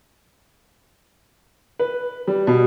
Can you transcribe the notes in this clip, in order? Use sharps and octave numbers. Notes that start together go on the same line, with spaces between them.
B4
G3
B2